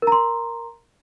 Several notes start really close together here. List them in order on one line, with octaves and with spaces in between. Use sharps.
A#4 A#5 C6